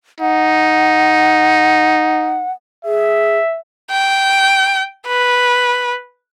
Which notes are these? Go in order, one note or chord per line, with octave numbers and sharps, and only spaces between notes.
D#4 F#5
G#4 E5
G5
B4